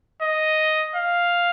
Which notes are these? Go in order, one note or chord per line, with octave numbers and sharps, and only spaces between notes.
D#5
F5